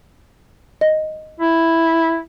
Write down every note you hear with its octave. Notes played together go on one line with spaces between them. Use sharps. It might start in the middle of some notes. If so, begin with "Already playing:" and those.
D#5
E4